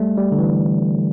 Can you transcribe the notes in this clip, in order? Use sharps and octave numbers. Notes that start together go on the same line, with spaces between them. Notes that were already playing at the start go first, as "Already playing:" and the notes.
Already playing: G3 A3
G3
D3
E3